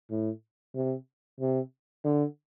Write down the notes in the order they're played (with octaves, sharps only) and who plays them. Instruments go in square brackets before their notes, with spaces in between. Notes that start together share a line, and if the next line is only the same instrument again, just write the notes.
[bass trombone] A2
C3
C3
D3